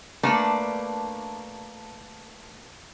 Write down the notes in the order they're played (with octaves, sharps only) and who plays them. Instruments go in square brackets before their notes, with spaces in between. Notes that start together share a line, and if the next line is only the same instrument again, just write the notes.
[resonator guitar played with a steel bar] A3 A#3 D4 B4